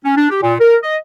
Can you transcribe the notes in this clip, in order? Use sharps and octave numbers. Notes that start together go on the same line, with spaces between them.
C#4
D4
G4
A#2
A#4
D#5